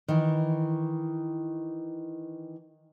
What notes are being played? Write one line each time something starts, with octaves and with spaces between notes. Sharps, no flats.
D#3 E3